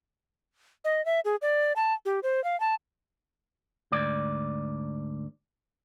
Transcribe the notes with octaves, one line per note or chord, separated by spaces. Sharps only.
D#5
E5
G#4
D5
A5
G4
C5
F5
A5
D2 G#2 D5